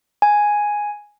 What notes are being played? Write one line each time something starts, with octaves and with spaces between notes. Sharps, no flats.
G#5